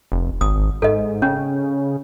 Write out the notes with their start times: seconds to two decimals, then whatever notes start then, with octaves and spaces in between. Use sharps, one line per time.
0.12 F1
0.41 G#1 D#6
0.82 G#2 A4 D#5
1.22 C#3 C#4